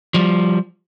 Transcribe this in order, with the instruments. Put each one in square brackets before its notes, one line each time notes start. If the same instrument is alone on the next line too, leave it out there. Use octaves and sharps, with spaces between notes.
[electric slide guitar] F3 G3